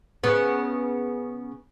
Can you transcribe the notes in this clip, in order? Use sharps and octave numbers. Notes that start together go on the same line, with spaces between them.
C#3 B3